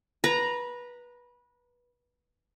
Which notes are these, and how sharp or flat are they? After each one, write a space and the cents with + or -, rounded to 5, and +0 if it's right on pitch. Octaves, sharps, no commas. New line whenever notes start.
B4 -20 A#5 +0